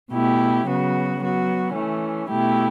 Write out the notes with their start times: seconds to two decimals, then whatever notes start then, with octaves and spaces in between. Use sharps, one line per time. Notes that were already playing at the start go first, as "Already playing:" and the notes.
0.11 B2 A3 E4 G4
0.66 C#3 F#3 B3 F#4
1.20 F#3 B3 F#4
1.74 E3 A3 C#4
2.29 B2 A3 E4 G4